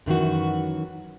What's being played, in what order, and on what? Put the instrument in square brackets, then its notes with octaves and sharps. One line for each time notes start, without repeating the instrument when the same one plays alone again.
[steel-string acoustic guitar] F#2 D#3 E3 F#4